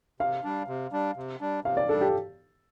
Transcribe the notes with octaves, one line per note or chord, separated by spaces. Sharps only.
C3 F5
G3 D4
C3
G3 D4
C3
G3 D4
C3 F5
D5
G3 D4 A4
G4